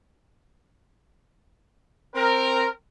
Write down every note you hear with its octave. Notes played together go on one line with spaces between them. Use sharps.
C4 A#4